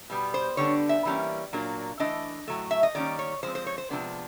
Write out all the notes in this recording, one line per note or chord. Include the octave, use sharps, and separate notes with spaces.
B2 G3 B3
C5
D3 G3 B3 D4 C#5
E5
E3 G3 A#3 C#4
A#2 F#3 A#3 D4
E3 A3 D4 D#5
A2 F#3 A3
E5
D#5
D#3 G3 A#3 C#4 D5
C#5
F3 G#3 C4 C5
C5
C#5
C5
C3 F3 G#3 B3 D4